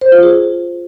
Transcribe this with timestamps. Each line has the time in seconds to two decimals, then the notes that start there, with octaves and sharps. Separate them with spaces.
0.01 C5
0.12 F4
0.23 G#4